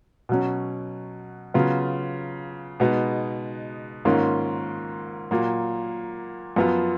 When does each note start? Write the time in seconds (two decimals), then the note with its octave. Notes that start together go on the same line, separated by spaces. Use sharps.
0.29 B2 F#3 C#4
1.54 C#3 F#3 B3 F4
2.80 B2 G#3 B3 D#4
4.05 G#2 D#3 A#3 C#4 F4
5.31 A#2 F#3 A#3
6.56 F#2 F3 B3 F4